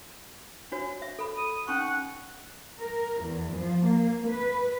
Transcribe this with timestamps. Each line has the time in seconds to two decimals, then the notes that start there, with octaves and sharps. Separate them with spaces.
0.72 D4 F#4 C#5
1.02 E5
1.19 A4 B5
1.37 D#6
1.68 C#4 D#4 F#5 C#6
2.78 A#4
3.21 E2
3.52 F3
3.85 A#3
4.27 B4